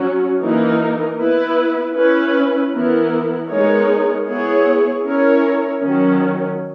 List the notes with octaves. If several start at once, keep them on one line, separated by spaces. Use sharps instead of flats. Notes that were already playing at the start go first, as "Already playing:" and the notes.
Already playing: F#3 C#4 F#4
E3 A#3 D#4 A#4
B3 E4 B4
C#4 E4 B4
E3 B3 E4 A#4
G#3 B3 D#4 A#4 C#5
B3 E4 G#4 C#5
C#4 E4 A#4 C#5
D#3 F#3 C#4